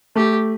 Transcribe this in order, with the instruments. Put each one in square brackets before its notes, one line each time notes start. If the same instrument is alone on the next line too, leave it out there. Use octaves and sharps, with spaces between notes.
[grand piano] A3 [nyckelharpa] G4